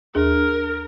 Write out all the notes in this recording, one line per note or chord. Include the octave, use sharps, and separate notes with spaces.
D#2 D4 G#4 A#4